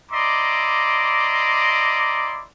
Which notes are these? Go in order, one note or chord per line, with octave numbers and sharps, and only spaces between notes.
E4 D5 D#5 A#5 C6 D6